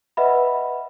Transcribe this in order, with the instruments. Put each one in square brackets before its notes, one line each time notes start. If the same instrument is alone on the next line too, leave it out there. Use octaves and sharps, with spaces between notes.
[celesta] B4 D#5 E5 F#5 B5